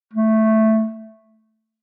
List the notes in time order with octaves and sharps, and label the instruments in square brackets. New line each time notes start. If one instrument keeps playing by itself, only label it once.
[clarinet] A3